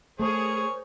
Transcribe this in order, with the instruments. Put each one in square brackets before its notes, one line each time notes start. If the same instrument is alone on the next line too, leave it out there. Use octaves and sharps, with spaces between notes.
[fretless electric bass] A3 [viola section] G#4 A#4 [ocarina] C5 [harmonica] C#5